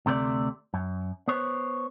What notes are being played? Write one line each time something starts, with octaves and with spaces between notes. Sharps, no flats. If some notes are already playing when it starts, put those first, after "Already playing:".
D2 C3 A3 B4 D5
F#2
B3 C5 C#5